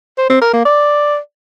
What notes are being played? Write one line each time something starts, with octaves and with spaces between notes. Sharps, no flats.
C5
C4
A#4
A#3
D5